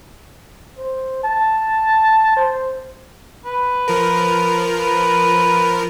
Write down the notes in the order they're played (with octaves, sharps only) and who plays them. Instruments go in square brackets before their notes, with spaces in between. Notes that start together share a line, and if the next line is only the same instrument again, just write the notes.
[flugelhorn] C5
A5
C5
[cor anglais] B4
[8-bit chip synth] F3 A#4
[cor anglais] B4